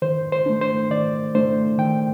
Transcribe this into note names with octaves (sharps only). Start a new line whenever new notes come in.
D#3 C5
C5
A3 D4
C5
D#3 D5
A3 D4 C5
D#3 G5